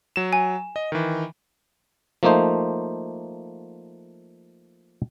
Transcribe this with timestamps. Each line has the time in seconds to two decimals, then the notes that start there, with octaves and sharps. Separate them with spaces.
0.16 F#3 E7
0.33 G#5
0.76 D#5
0.92 D#3 E3
2.23 F3 A3 A#3 D#4 C5